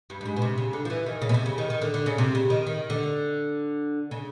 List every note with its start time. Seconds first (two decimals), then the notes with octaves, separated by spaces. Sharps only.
0.10 G2
0.21 G2
0.26 G#2
0.36 B2
0.42 C3
0.58 C#3
0.73 D3
0.85 F3
0.90 E3
1.06 D#3
1.22 C#3
1.29 B2
1.34 C3
1.46 C#3
1.58 D#3
1.70 D#3
1.82 D3
1.94 D3
2.06 C#3
2.18 C3
2.35 C#3
2.50 D#3
2.67 D#3
2.90 D3
4.11 C#3